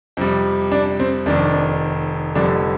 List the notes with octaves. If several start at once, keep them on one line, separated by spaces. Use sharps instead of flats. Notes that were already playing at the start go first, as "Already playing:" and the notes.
F2 C3 G3
D4
C4
F1 F2 D#3 D4
F1 F2 D3 G3 D4